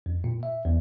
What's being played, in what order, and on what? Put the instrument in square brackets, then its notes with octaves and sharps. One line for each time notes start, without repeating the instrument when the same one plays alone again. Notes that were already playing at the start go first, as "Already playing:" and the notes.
[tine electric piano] F2
A#2
E5
E2